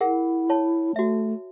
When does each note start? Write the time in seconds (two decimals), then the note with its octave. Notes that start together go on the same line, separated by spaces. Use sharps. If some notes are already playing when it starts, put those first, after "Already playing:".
0.01 E4 G#4 A#4 F#5
0.50 C#5 A5
0.96 A3 F#4 E5